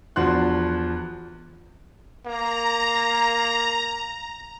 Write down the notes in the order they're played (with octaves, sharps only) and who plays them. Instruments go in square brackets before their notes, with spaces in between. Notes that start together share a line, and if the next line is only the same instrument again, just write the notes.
[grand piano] E2 F3 D4 F#4 C6 F#6
[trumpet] A#3 [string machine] A#5